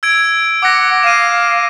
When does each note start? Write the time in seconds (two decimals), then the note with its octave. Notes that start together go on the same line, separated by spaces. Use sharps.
0.03 E6 G#6 D7
0.62 F#5 D6 A#6
1.03 F5 D#7 E7